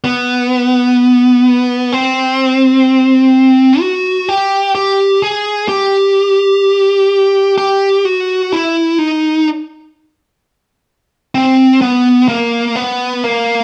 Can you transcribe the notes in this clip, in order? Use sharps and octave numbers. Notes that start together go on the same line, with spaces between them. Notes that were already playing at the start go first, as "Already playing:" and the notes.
B3
C4
F#4
G4
G4
G#4
G4
G4
F#4
E4
D#4
C4
B3
A#3
B3
A#3